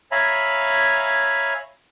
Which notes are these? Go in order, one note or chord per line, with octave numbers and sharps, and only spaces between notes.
C#5 E5 F5 G#5 A#5 B5